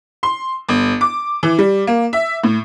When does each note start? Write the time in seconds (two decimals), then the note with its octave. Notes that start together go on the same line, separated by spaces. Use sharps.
0.23 C6
0.69 G1
1.01 D6
1.43 E3
1.59 G3
1.87 A#3
2.13 E5
2.44 A2